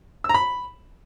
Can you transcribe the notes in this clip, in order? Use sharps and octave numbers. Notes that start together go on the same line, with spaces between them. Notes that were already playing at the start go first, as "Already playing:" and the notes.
E6
A#5
B5